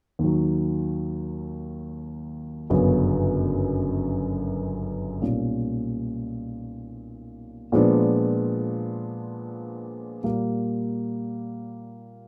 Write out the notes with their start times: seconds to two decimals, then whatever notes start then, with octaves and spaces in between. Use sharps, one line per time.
0.19 D#2 D#3 F#3
2.70 G1 F#2 C#3 F#3 B3
5.21 B1 A#2 G3 A#3 C#4
7.72 A#2 F3 G#3 B3 D4
10.23 A#2 G3 A#3